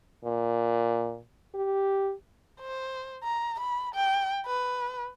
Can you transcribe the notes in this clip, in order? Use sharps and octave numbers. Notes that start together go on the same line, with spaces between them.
A#2
G4
C5
A#5
B5
G5
B4